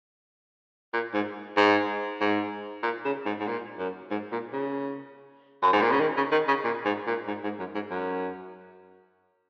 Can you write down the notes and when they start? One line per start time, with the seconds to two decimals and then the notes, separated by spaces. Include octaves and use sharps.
0.93 A#2
1.14 G#2
1.57 G#2
2.21 G#2
2.83 A#2
3.05 C#3
3.26 G#2
3.40 G#2
3.47 A#2
3.79 F#2
4.11 G#2
4.32 A#2
4.53 C#3
5.63 F#2
5.73 G#2
5.82 A#2
5.91 C#3
6.00 D#3
6.17 C#3
6.32 D#3
6.48 C#3
6.64 A#2
6.85 G#2
7.07 A#2
7.28 G#2
7.44 G#2
7.59 F#2
7.75 G#2
7.91 F#2